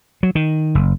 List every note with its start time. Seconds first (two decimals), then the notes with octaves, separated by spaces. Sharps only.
0.23 F#3
0.35 D#3
0.75 F#1